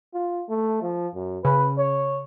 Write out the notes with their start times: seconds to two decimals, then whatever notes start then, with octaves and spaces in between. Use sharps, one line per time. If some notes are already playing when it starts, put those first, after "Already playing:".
0.14 F4
0.49 A3
0.82 F3
1.15 F#2
1.45 C#3 B4
1.78 C#5